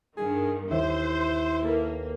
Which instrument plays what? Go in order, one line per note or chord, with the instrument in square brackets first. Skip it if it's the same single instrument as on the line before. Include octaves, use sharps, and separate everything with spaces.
[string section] G2 D#3 [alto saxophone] G#4
[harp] D#2 E5 [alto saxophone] E4 [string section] C5
[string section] A#3 [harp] A4 B4